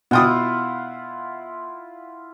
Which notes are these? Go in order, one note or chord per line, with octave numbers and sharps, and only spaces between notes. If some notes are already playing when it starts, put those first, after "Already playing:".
B2 E4 F4 F#5 G5 D#6